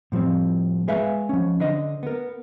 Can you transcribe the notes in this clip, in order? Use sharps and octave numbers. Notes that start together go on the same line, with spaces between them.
A2 F3 G3 C4
G#3 G#4 B4 E5 F5 G#5
F3 C#4
D3 D4 C5 D#5
B3 A#4